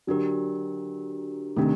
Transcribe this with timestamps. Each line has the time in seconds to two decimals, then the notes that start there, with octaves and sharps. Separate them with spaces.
0.07 D3 F#3 D4 G4 A#4
1.57 C3 D#3 A3 D4 G4 A#4